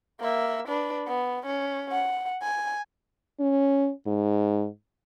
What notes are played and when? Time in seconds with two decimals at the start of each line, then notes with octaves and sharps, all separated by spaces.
0.20 A#3 E5
0.68 D4 B4
1.07 B3
1.46 C#4
1.92 F#5
2.42 G#5
3.40 C#4
4.07 G#2